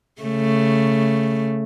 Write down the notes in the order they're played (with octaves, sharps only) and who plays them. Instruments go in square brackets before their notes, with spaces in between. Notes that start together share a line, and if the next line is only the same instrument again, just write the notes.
[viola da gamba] C#3 A3